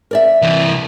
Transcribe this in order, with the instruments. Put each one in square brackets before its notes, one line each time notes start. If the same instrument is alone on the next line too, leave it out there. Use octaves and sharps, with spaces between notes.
[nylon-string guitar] A#4 D5 E5
[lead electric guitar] C2 E3